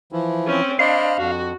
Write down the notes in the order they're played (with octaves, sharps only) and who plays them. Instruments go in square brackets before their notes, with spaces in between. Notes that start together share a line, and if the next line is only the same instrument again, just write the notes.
[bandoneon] E3 F3 E4
[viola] C4 C#4
[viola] D4 [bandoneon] C5 D#5 B5 [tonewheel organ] F5
[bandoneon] F2 [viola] F#4